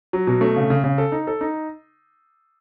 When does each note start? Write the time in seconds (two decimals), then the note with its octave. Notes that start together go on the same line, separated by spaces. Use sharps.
0.13 F#3
0.27 B2
0.41 A3
0.56 C#3
0.70 C#3
0.84 C#3
0.98 A4
1.12 D#4
1.27 A4
1.41 D#4